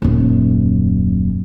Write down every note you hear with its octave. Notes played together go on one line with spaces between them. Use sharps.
D#1 F#2